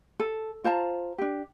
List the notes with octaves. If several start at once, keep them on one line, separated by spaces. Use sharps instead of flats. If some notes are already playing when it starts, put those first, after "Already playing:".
A4
F4 C5 A5 A#5
D4 G4